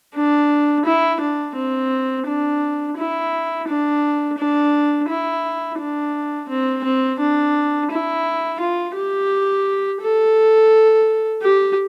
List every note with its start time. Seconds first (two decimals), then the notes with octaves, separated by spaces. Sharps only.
0.15 D4
0.85 E4
1.20 D4
1.55 C4
2.26 D4
2.98 E4
3.68 D4
4.38 D4
5.09 E4
5.79 D4
6.49 C4
6.84 C4
7.19 D4
7.91 E4
8.60 F4
8.96 G4
10.01 A4
11.42 G4